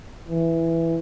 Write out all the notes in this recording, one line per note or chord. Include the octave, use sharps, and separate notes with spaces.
E3